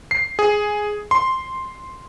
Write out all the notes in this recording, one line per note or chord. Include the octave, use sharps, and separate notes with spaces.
C7
G#4
C6